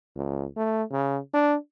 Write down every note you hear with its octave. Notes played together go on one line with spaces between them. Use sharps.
C#2
A3
C#3
D4